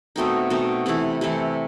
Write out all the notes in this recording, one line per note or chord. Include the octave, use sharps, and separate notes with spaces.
B2 A3 C4 D#4
B2 A3 C4 D#4
C3 E3 A3 E4
C3 E3 A3 E4